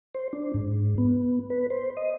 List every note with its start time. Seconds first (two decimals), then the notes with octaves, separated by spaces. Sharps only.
0.15 C5
0.33 D4
0.54 G#2
0.98 B3
1.50 B4
1.70 C5
1.97 D#5